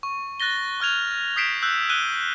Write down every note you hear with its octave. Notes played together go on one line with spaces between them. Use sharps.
C#6
F#6 A6 A#6 G7
C#6 F6 G#6 F7
D#6 G6 B6 C7 D7 E7
E6 F#6 G6
E6 F#6 D#7 G7